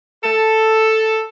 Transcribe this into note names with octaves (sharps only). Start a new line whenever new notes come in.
A4